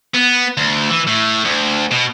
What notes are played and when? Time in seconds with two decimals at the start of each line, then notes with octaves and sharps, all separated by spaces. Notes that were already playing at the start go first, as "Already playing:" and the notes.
0.14 B3
0.57 D2
0.90 E3
1.07 A2
1.45 D2
1.91 B2